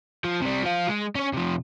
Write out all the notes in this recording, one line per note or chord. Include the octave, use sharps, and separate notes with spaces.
F3
C3 G3
F3 F4
G#3
C#4 C#5
C3 F3